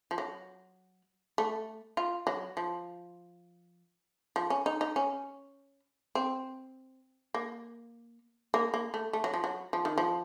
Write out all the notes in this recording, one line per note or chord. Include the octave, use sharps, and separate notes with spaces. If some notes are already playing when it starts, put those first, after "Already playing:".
F3
F#3
A3
F4
F#3
F3
F3
C#4
D#4
D#4
C#4
C4
A#3
A#3
A#3
A3
A3
F#3
F3
F#3
F3
D#3
F3